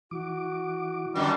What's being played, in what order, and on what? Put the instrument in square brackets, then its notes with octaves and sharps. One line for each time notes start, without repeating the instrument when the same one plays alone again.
[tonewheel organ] E3 D6 [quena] F#4
[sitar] F#2 D3 D#3 [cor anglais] G3